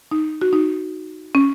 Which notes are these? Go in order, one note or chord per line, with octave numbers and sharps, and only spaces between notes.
D#4
F#4
D#4
C#4